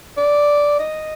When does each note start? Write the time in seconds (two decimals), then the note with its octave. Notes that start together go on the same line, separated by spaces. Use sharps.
0.17 D5
0.79 D#5